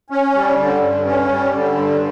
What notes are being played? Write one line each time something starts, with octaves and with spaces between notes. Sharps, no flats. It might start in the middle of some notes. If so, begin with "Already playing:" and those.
C#4
G3
D3
G2
C#4
G3
D3
G2